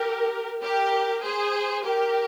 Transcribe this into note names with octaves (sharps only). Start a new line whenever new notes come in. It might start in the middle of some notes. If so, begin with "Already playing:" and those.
Already playing: G4 A#4
G4 A#4
G#4 C5
G4 A#4